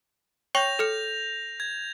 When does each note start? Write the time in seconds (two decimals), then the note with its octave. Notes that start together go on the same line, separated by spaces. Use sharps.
0.55 C#5 G5 C#6 G6 A#6 F7
0.79 A4 F6 C#7
1.60 G#6